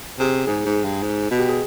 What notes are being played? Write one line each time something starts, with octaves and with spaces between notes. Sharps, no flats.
C3 G#4
G#2 G#4
G#2
G2
G#2
B2
G4
G#4